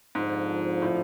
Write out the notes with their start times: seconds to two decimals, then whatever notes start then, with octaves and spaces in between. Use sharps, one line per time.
0.15 F2 G#2 D3 F3
0.82 A2